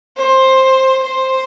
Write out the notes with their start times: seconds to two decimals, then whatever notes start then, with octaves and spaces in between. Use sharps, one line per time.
0.17 C5
1.03 C5